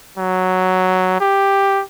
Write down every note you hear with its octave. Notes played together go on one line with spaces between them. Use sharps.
F#3
G4